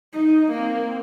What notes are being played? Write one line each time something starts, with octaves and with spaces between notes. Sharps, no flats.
D#4
A#3 C4